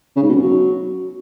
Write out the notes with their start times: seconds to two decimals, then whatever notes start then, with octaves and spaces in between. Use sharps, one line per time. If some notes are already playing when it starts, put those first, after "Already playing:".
0.16 C#3
0.22 G#2
0.29 B2
0.35 F#2
0.42 F#3